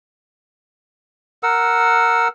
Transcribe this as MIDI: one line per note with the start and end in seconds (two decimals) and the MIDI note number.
1.43 2.28 70
1.43 2.28 78
1.43 2.28 88